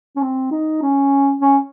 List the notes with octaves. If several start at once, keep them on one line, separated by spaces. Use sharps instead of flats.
C#4
C4
D#4
C#4
C#4